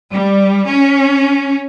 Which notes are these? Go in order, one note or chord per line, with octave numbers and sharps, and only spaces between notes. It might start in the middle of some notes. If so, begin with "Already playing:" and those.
G3
C#4